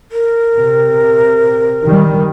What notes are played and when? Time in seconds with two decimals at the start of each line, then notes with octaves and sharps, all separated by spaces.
0.12 A#4
0.54 C3
1.83 D#3 G3